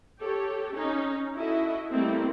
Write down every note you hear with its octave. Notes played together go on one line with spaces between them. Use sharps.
G4 A4 C#5
C#4 D#4
E4 F#4 A4 D#5 E5
G3 A3 A#3 C4 D#4 E4